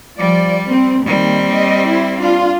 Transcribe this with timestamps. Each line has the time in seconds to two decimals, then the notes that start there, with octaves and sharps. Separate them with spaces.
0.19 F3 G3 D5
0.67 C4
1.06 D#2 D#3 G3 C4
1.55 D#5
1.89 E4
2.20 D4 F4